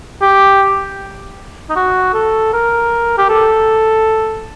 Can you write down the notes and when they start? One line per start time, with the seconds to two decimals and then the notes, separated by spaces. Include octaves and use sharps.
0.22 G4
1.69 D#4
1.76 F#4
2.14 A4
2.53 A#4
3.18 G4
3.29 A4